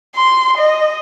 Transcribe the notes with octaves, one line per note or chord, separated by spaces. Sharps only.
C6
D#5